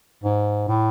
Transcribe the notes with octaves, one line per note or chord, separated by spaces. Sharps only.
G#2
A2